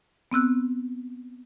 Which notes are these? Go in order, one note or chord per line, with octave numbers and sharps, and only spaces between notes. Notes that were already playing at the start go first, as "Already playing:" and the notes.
B3 C4 E6 F#6